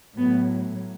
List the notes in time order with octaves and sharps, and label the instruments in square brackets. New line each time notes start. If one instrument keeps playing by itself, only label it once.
[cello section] A2 F#3 B3